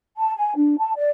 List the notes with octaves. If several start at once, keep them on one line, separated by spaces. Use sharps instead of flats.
A5
G#5
D4
A5
D5